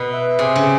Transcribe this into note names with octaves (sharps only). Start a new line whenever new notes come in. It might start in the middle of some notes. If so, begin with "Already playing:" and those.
Already playing: B2 B4
E5
C3 G#4
C#3